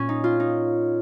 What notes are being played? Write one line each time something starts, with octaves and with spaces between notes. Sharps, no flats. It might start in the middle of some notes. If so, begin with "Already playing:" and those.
Already playing: A#2 C#4
D#4
F4
D#4